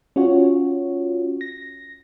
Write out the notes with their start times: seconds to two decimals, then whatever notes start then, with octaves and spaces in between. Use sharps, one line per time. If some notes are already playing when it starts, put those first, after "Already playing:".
0.16 C#4 F4 F#4 C#5
1.41 A#6